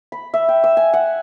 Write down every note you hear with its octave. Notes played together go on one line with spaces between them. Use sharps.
B5
E5
G5
E6
G#5
F#5